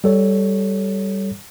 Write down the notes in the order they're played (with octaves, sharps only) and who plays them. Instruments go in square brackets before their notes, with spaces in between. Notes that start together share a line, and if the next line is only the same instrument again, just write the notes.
[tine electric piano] G3 A4 C#5